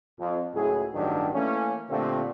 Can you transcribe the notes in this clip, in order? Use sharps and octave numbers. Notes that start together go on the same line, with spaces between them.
F2
C#2 A2 F#3 E4 G#4
A1 G2 D#3 F#3 G3 D4
E3 A3 A#3 C#4
A#2 D3 A3 C4 F4 G4